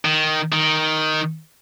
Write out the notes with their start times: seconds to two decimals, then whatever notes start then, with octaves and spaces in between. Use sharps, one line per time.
0.05 D#3
0.53 D#3